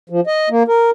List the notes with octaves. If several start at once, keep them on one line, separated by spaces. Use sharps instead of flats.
F3
D#5
A#3
A#4